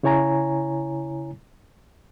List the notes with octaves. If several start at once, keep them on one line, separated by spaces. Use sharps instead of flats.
C#3 E4 C#5 G#5 A#5